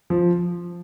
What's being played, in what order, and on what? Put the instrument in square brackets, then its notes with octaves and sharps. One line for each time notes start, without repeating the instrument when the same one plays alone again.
[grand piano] F3